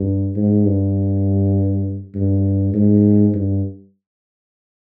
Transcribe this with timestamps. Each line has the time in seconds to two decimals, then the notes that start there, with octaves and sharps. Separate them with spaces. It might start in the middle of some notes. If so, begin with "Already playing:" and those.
Already playing: G2
0.36 G#2
0.66 G2
2.15 G2
2.74 G#2
3.34 G2